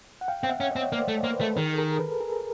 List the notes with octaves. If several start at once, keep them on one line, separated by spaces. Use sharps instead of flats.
F#5
F5 G5
C4 G5
E5 F#5
C#4
C4 C#5 D#5
A#3 C5 D5
A3
A#3 C5
B4
A3 A#4
A4 B4
D#3 G#4 A#4
A4
G#4 A#4
A4 B4
G#4 A#4